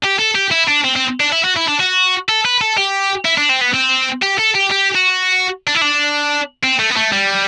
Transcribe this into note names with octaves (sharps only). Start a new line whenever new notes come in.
G4
A4
G4
E4
D4
C4
C4
D4
E4
F#4
E4
D4
F#4
A4
B4
A4
G4
E4
D4
C4
B3
C4
G4
A4
G4
G4
F#4
D4
E4
D4
C4
A3
B3
A3
G3